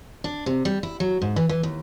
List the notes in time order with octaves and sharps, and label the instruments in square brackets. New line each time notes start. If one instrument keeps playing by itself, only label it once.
[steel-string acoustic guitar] D4
C3
G3
E4
F#3
G#2
E3
E3
D#2